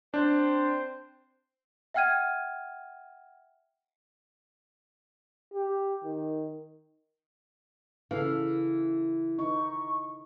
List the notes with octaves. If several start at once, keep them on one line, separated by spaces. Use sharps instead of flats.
C4 D4 C5 C6
E5 F#5 G5 F6 G#6 D#7
G4
D#3
C#3 E3 A4 F5
D#4 C#6